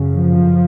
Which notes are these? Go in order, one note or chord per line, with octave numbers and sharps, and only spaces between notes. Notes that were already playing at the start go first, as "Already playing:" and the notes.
Already playing: F#2 C#3
F3